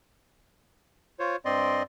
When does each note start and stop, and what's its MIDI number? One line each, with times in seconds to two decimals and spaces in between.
1.19 1.36 65
1.19 1.36 72
1.19 1.36 73
1.45 1.83 43
1.45 1.83 60
1.45 1.83 74
1.45 1.83 75
1.45 1.83 84